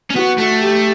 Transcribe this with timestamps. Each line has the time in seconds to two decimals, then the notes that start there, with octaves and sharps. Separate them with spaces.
0.10 C#4
0.15 B3 F#4
0.38 A3
0.61 G4